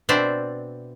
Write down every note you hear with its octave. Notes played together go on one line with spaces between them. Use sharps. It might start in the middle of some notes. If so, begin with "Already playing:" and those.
B2 C4 D4 C5 D5 E5